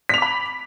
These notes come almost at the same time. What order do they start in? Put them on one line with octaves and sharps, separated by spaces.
B6 F7 D6 B5